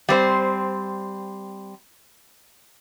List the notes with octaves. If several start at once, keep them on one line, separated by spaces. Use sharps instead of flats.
G3 C4 C5